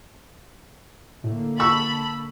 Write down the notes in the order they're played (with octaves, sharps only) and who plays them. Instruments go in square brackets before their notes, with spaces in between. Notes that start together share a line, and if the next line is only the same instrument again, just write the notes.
[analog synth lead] A2 [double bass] D3 A#3
[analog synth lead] A5 [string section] B5 [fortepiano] C#6 E6